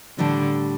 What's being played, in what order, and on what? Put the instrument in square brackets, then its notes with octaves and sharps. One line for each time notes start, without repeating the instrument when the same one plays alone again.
[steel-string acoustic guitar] A2 G3 D4 [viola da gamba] D3